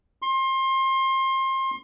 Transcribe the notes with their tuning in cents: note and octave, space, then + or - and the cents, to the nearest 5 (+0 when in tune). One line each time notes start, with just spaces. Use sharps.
C6 +30